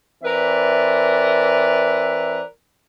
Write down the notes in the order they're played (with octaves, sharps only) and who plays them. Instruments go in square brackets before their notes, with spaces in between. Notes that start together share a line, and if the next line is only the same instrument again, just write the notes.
[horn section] E3 C4 A#4 B4 D5 E5